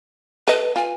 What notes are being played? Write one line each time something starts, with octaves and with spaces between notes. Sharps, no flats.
A4 B4 D#5
F4 G#5